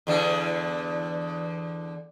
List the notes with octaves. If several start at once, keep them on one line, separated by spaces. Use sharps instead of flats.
E2 D3